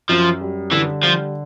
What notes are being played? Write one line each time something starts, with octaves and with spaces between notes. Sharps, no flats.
F#2 F3
G3
D3 E3
F3 G3